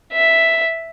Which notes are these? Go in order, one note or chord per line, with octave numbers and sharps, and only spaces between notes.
E5